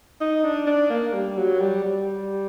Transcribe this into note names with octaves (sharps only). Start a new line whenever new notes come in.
D#4
D4
D4
A#3
G3
F#3
G3
G3